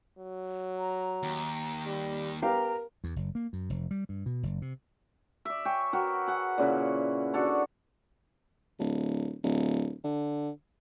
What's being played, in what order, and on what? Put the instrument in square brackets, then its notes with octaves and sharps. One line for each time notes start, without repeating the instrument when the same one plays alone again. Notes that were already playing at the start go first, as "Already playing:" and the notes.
[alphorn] F#3
[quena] A#5
[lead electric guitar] D#2
[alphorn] G3
[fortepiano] B3 G4 F5 [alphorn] A#4 [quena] A#5
[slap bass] E2
F#1
A#3
F#2
F1
G3
G2
B2
F#1
C3
[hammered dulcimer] D5 E5
C#5 G5 G#5
F#4 A#4 B4 G5
G#4 F#5
A#2 C#3 E4 B4
D4 F#4 A4 C#5
[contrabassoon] D1
D1
D3